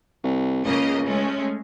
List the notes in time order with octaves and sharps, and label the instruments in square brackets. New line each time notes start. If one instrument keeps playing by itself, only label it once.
[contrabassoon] C2
[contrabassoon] C#2 [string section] C#3 A#3 D#5
[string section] G#3 A3 C#4